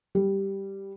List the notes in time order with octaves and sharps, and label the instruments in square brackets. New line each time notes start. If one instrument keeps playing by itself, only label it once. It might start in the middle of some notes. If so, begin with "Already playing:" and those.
[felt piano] G3